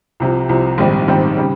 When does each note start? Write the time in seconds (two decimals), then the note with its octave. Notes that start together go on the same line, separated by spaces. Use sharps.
0.20 C2 C3 F3
0.49 C2 C3 F3
0.78 A#1 G#2 D#3 G3 C4
1.08 A#1 G#2 D#3 G3 C4
1.37 C#3 G3